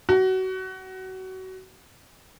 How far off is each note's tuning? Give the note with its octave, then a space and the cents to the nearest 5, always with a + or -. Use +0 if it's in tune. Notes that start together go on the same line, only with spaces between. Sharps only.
F#4 +25